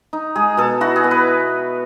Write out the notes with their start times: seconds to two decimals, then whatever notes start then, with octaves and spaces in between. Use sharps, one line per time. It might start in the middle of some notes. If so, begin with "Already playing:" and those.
0.13 D#4
0.36 G#3 G#4
0.57 B2 A4
0.81 E4 F#4
0.96 G#4
1.04 B3
1.11 B4